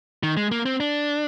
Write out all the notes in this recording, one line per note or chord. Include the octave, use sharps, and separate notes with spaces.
D#3
G#3
A#3
C4
D4